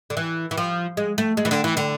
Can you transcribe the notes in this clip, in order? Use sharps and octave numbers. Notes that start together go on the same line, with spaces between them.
D3
E3
E3
F3
G#3
A3
G#3
E3
D3
E3
D3